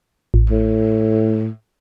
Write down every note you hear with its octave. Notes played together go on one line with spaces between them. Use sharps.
A1
A2